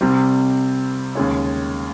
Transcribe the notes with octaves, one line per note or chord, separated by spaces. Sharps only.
C2 C3 G3 C4
D#2 C#3 G#3 C#4